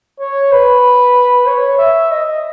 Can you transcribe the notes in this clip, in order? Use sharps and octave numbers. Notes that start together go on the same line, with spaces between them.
C#5
B4
C#5
E5
D#5